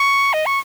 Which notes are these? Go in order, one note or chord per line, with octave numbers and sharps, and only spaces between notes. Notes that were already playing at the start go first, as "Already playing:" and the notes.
Already playing: C#6
D#5
C#6